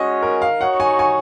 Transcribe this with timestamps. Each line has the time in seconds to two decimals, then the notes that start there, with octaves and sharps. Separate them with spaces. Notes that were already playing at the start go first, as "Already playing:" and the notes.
Already playing: G#3 C#4 F#4 D#5
0.22 A#4
0.42 F5
0.60 D#4 F#4 C#5 F#5
0.80 G#5
0.99 G#5